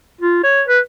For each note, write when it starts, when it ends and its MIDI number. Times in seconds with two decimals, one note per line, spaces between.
0.21 0.43 65
0.44 0.62 73
0.68 0.79 71